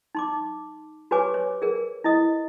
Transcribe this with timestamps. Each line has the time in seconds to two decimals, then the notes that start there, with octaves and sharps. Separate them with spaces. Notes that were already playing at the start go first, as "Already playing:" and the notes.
0.15 D#4 C6 D6
1.11 F#4 G4 B4 C#5 G#5 D6
1.34 C#5
1.62 G#4 A#4
2.04 E4 D#5 D#6